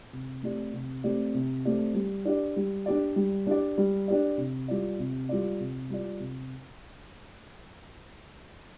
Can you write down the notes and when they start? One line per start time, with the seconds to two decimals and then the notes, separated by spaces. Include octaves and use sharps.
0.13 C3
0.43 A3 C4 G4 D5
0.73 C3
1.04 A3 C4 G4 D5
1.34 C3
1.65 A3 C4 G4 D5
1.94 G3
2.25 D4 G4 D5
2.56 G3
2.86 D4 G4 D5
3.16 G3
3.47 D4 G4 D5
3.78 G3
4.08 D4 G4 D5
4.38 C3
4.68 G3 F4 D5
4.99 C3
5.29 G3 F4 D5
5.60 C3
5.90 G3 F4 D5
6.20 C3